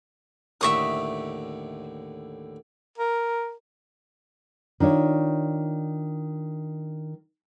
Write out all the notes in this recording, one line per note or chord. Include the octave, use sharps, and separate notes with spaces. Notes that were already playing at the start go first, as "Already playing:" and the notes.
D#2 A2 D3 E5 C#6 D#6
A#4
D#3 D4 F4 C#5